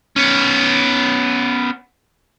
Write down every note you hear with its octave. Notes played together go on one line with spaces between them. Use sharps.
B3 C#4